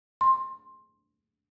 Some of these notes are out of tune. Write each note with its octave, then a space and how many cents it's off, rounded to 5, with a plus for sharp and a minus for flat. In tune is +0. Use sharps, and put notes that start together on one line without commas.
C6 +15